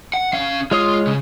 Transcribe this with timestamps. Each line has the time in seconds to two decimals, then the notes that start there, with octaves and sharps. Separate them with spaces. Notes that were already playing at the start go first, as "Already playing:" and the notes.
0.14 F#5
0.34 C#4 F5
0.71 G#3 F4 C#5 D#6
1.07 C#3